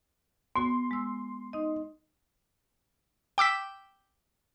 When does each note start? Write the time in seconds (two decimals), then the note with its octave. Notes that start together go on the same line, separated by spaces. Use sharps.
0.56 B3 F#4 C6
0.91 G#3 E6
1.53 D#4 D#5
3.38 G5 D6 E6 B6